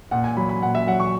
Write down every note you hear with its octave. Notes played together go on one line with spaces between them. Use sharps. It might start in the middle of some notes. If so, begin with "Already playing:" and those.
A#2 F#5
G#5
F#3 B5
B5
A#2 F#5
E5
F#3 F#5
C#6